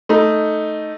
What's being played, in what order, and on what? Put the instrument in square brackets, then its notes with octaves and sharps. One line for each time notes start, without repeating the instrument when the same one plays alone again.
[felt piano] A3 D#4